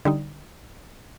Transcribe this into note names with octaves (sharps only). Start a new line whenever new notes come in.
D3 G3 D#4